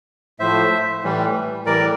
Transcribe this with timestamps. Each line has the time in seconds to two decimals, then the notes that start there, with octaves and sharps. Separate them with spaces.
0.39 A2 F3 A3 C5 E5
1.03 A2 E3 G3
1.66 A2 E3 G3 A#4 D5